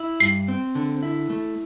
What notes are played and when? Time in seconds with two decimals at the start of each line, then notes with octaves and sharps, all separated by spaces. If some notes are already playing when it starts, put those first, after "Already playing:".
Already playing: E4
0.20 G2 C7
0.48 C4
0.75 D3
1.03 E4
1.30 A3